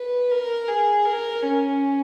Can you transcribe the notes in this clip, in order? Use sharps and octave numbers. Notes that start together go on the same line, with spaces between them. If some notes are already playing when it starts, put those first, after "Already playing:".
Already playing: B4
A#4
G#4
A#4
C#4